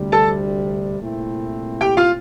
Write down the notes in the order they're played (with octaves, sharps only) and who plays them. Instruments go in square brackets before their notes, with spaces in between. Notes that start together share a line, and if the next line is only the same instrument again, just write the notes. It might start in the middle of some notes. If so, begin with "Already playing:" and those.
Already playing: [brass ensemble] D2 C3 G3
[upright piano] A4 A5
[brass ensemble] C2 A#2 A3 C4 E4
[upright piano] G4 G5
F4 F5